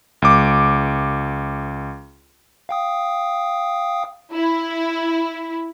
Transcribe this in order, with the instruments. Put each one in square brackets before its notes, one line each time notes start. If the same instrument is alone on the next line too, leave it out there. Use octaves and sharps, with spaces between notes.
[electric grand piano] C#2 D6
[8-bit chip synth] F5 G5 D#6
[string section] E4